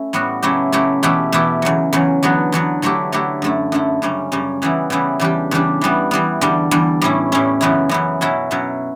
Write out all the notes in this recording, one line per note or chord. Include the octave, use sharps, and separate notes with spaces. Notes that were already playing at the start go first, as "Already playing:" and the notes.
Already playing: A3 C#4 E4
A2 G3 B3 F#4
C#3 F#3 A3 E4 G4
C#3 F#3 A3 E4 G4
E2 B2 A3 E4 G4
E2 B2 A3 E4 G4
E2 C#3 F#3
E2 C#3 F#3
E2 D3 F#3 B3
E2 D3 F#3 B3
D3 F#3 A3 E4 G4
D3 F#3 A3 E4 G4
F#2 D3 A3 E4
F#2 D3 A3 E4
F#2 C#3 G3 C#4
F#2 C#3 G3 C#4
C#3 E3 G3 B3 E4
C#3 E3 G3 B3 E4
E2 C#3 G3 D4 G4
E2 C#3 G3 D4 G4
E3 G3 B3
E3 G3 B3
E2 D3 G3
E2 D3 G3
A2 G3 C#4 E4
A2 G3 C#4 E4
F#2 C#3 E3 B3 E4
F#2 C#3 E3 B3 E4
B2 F#3 C#4 E4
B2 F#3 C#4 E4